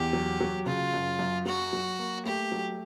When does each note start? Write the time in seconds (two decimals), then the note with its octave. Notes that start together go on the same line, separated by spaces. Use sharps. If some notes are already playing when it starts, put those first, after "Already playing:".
Already playing: E2 G4
0.13 F#3
0.41 F#3
0.66 C#3 F4
0.94 F#2
1.19 F#2
1.46 F#3 F#4
1.73 F#3
1.99 A#3
2.26 A3 G4
2.52 F#3